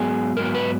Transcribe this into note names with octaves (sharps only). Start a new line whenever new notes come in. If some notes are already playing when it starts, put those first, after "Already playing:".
Already playing: G#2 F#3 B3 G#4
G#2 F#3 B3 A#4
B4